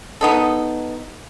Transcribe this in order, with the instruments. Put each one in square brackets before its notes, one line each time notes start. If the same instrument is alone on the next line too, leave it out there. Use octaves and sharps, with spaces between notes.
[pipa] B3 D#4 A4